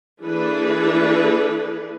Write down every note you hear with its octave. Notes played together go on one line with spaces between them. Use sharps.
E3 A#3 D4 G#4 A4 B4